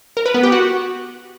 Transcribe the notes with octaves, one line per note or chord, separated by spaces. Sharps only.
A#4
B4
B3
G4
F#4